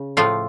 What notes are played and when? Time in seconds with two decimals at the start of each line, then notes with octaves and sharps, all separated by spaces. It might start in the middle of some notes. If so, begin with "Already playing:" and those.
Already playing: C#3
0.17 A2 F3 A3 F4